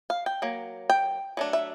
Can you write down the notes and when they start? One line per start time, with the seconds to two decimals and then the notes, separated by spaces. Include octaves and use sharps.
0.10 F5
0.26 G5
0.42 F#3 A#3
0.90 G5
1.37 F#3 A3 D4
1.53 E5